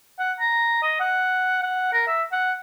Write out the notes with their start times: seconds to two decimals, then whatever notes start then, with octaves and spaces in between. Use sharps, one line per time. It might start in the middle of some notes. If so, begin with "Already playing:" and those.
0.18 F#5
0.40 A#5
0.82 D#5
1.00 F#5
1.62 F#5
1.93 A#4
2.07 E5
2.32 F#5